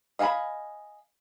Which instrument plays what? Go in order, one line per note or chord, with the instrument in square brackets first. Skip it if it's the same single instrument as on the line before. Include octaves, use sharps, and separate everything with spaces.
[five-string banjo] D#5 F5 G#5 A5 B5